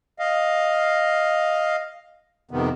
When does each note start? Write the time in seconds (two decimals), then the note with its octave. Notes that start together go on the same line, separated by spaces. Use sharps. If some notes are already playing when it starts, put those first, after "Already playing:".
0.19 D#5 F5
2.51 F2 C3 D#3 B3